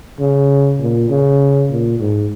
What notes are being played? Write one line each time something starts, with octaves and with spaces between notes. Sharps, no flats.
C#3
A#2
C#3
A#2
G#2